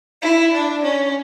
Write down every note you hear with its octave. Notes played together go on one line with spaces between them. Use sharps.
E4
D4
C#4